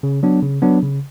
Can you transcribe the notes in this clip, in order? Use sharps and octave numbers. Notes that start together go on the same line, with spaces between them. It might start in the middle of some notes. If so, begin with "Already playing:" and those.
C#3
F#3 B3 D4
C#3
F#3 B3 D4
C#3